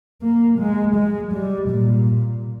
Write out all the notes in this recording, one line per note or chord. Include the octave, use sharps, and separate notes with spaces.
A#3
G#3
G#3
G3
A#2